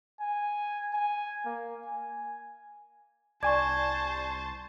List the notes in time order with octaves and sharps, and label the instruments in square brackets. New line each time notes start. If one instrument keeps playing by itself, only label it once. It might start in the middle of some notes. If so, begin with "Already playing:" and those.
[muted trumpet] G#5
G#5
A#3
G#5
[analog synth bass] C2 [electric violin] C5 A5 [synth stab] D5 G#5 [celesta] C#6 G#6